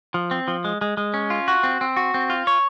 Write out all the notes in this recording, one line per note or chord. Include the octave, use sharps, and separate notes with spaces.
F3
C4
F3
G#3
G#3
G#3
C#4
F4
F#4
C4
C4
F#4
C4
F4
C#5